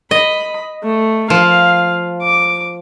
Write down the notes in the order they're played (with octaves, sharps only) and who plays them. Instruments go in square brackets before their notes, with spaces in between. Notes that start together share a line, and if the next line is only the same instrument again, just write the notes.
[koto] D#5 [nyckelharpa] B5
[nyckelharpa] A3
[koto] F3 [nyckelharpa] F5
[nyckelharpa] D6